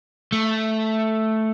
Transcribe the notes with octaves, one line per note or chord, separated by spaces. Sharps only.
A3